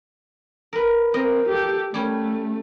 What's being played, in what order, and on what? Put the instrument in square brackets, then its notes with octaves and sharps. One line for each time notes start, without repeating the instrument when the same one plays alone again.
[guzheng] A#4 B4
[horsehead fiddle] C4 [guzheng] A#4 D#5
[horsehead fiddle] G4 A4
[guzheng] G3 C#4 [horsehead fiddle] A3